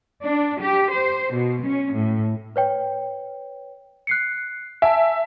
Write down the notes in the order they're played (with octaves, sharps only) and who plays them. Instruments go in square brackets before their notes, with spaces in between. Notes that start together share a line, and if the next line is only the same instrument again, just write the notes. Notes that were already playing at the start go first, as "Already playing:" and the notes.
[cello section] D4
G4
C5
B2
C#4
A2
[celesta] B4 C#5 G5
F#6 C7 C#7
[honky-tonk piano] E5 [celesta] G#5 A5